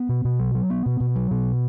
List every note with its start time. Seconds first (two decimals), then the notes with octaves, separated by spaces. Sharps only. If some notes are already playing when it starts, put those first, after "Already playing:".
Already playing: B3
0.09 B2
0.25 B2
0.39 F#3
0.55 F#3
0.70 B3
0.86 B2
1.00 B2
1.16 F#3
1.31 B2